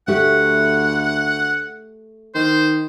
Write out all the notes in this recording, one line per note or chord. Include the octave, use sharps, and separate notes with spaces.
D2 A3 G4 F#5
D#3 C5